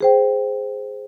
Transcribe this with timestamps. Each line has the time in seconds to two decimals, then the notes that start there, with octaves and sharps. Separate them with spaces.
0.01 G#4 C5 G5